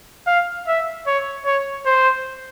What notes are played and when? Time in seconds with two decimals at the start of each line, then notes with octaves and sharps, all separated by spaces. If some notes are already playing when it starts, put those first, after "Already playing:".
0.27 F5
0.67 E5
1.07 C#5
1.45 C#5
1.86 C5